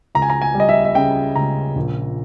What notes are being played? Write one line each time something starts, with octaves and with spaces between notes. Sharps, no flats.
C#2 A#5
G#5
A#5
G#5
G3
D#5
E5
E5
C#3 G5
C#2 A#5
A#1